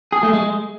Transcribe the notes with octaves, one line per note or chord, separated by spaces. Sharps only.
G#4
A3
G#3